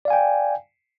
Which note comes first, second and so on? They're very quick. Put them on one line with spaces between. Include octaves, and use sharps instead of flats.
D5 F5 G#5 G5